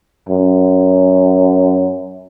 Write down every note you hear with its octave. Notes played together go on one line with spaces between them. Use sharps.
F#2